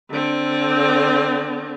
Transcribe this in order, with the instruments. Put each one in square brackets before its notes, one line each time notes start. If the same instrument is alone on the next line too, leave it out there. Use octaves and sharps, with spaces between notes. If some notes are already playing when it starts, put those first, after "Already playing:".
[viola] D3 C4